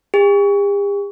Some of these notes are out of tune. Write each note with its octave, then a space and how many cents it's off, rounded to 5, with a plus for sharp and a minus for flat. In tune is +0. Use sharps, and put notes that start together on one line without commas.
G4 +45